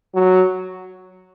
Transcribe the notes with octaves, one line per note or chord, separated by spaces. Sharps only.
F#3